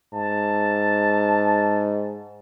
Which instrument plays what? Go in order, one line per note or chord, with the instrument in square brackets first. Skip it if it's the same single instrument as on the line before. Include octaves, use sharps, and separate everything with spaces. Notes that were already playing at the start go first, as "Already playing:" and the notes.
[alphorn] G#2 [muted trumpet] A5